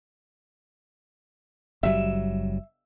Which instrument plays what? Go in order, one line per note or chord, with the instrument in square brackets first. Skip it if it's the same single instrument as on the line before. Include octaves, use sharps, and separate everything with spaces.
[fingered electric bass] F#1 F#3 G3 [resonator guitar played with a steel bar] E5